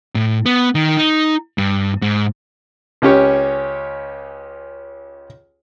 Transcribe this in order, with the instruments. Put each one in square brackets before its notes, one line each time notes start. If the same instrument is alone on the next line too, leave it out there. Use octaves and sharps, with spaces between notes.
[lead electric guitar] A2
B3
D#3
D#4
G2
G#2
[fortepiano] C#2 C#4 G4 C#5